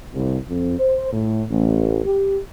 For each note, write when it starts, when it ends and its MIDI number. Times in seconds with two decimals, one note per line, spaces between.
0.14 0.37 36
0.49 0.76 41
0.79 1.11 72
1.13 1.44 45
1.50 2.04 33
2.06 2.39 67